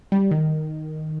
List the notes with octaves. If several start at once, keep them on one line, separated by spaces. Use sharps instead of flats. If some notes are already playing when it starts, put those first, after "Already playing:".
G3
D#3